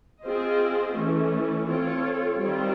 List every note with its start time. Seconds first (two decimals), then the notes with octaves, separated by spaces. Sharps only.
0.24 C4 F4 G#4 C5 D#5
0.96 E3 A3 C#4
1.68 C4 F4 A4 C#5
2.40 D#3 G3 C4 F4